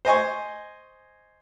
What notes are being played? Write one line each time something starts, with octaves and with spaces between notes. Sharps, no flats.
C5 D#5 G#5 C#6